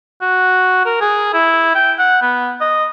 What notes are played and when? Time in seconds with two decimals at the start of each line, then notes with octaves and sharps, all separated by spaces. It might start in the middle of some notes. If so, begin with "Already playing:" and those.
0.21 F#4
0.85 A#4
1.01 G#4
1.33 E4
1.75 G5
1.98 F#5
2.22 B3
2.61 D#5